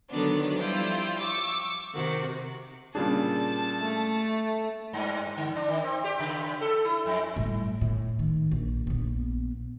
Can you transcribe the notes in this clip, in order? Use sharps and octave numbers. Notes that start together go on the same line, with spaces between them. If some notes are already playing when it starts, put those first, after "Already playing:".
D3 D#3 F#3 B3 D4
F3 G3 E4 F4 G5
C#6 D6 E6
C3 D#3 F#4
A#2 C#3 G3 D4 G#4 A5
A3
G2
D3
D4
D#3
C4
G4
C#3
A4
E4
F2
A2 G3
A2
D#3
A#1
A#1 B3